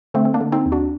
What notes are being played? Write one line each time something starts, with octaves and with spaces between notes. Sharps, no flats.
D3 A3 C4
C4
A#3 D4
D3
C4 D#4
D#2
D4 F#4